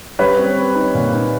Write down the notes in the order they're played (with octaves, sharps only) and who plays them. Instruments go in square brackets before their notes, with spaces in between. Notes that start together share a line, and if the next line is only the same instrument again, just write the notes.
[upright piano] G3 B4 C#5
C4
C4
D#4
A#2
D#4